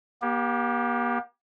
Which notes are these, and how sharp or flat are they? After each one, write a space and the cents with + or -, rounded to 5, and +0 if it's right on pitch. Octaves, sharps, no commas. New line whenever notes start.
A#3 +45 G4 +0